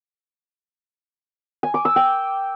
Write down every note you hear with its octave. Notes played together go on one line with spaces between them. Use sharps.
G#5
D6
E6
G5